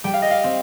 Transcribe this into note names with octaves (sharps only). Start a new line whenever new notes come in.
G3 G5
F5
D#5
F5
C4